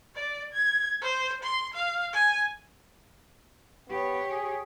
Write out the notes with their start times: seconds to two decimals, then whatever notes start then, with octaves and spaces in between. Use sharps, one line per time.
0.15 D5
0.53 G#6
1.01 C5
1.43 C6
1.74 F5
2.13 G#5
3.89 B3 G4 C#5
4.31 G#4